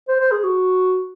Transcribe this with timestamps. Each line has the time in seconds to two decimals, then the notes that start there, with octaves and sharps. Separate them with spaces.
0.08 C5
0.20 C5
0.31 G#4
0.43 F#4